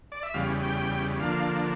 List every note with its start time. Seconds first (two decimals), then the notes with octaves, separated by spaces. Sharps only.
0.12 D5
0.23 E5
0.34 E2 C#3 G3 F5
0.63 G5
1.20 D3 F3 A#3 D4 F5